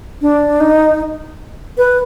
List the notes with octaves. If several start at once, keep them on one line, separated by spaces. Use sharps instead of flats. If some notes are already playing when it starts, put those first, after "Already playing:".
D4
D#4
B4